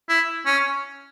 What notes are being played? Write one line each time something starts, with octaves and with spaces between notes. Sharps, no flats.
E4
C#4